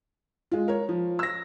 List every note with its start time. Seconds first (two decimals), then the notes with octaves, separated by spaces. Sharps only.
0.51 G#3 F4
0.68 A#4 C#5
0.89 F3
1.19 E6 A#6